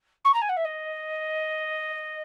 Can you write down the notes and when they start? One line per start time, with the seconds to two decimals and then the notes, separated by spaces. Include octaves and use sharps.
0.24 C#6
0.33 A#5
0.41 G#5
0.49 F#5
0.56 E5
0.64 D#5